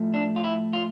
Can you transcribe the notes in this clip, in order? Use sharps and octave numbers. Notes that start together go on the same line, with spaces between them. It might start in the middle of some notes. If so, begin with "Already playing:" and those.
Already playing: A2 F3 A3
D4
F4
E4
F4